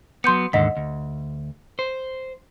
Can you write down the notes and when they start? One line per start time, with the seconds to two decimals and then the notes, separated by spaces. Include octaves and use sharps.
0.24 F#3 B3 C6 G6 C#7
0.53 D#2 G#2 D3 D#5 F#5 B6
0.77 D2
1.79 C5